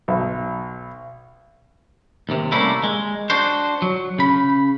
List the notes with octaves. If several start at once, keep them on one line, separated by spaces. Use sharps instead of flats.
B1
D#2 C3
G3 A3 A#3 C#4 E4
G#3
D4 F#4 C5
F#3
C#3 B5